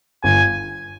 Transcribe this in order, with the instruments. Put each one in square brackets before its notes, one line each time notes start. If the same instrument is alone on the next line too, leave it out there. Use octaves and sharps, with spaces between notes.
[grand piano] G1 [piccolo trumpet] G#5